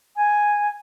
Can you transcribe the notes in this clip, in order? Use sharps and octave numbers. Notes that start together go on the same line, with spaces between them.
G#5